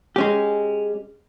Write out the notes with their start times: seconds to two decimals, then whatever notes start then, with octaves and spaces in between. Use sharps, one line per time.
0.16 G#3 C#4 G4